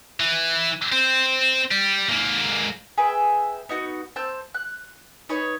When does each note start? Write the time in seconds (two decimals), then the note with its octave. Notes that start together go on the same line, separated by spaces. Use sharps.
0.20 E3
0.92 C4 C5
1.72 G3
2.09 G#2 A#3
2.98 G#4 B4 E5 G5
3.69 B3 D#4 F#4
4.16 C4 A5 E6 G6
4.54 F#6
5.29 D#4 B4 C#5 C#6